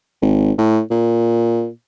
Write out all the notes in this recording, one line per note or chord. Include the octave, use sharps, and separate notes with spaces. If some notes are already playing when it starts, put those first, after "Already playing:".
G#1
A2
A#2